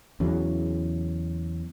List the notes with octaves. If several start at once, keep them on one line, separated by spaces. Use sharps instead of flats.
E2 C#3 F#3